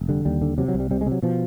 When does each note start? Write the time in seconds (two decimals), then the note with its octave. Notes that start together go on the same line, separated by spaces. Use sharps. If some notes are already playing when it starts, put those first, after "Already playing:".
Already playing: F1
0.09 D3 G3
0.25 D#2 G3
0.42 D3
0.58 C3 F#3
0.68 F#3
0.74 C2
0.80 G3
0.91 C3 G3
1.01 G#3
1.06 C3
1.12 F#3
1.22 B2 F3